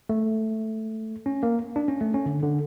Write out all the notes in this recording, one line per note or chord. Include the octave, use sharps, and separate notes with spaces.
A3
C#4
A#3
D4
C#4
A3
C#4
D3
D3